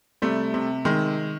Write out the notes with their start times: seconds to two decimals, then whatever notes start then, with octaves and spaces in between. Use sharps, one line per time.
0.22 C3 G3 A3
0.54 C3
0.85 D#3 G#3